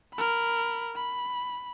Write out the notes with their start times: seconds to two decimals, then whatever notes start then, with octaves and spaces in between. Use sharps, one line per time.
0.14 A#4 B5
0.96 B5